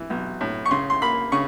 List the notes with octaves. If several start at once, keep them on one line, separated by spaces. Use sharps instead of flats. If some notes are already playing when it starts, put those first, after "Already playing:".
Already playing: E3
B1
A2
C#6
C#3 C6
C6
A#3 B5
C#3 C#6